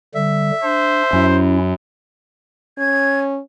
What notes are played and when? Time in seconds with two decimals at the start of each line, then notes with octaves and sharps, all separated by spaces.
0.15 D3 G3 E5
0.63 D4 C5
1.13 F#2 C#4 E4
2.78 C#4 G#6